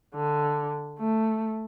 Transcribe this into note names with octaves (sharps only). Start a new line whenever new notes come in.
D3
A3